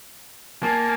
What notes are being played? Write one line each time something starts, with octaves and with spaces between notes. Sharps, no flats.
A#3 G#5 A5